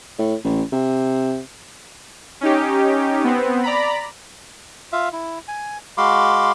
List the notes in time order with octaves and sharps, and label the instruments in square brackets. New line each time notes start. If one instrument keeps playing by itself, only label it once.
[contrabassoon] A2
A1
C3
[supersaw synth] C#4 D#4 G4
B3 C4
D5 A#5 B5
[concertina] F4 E5 F5
E4
G#5
G#3 F#4 F5 B5 C6 D6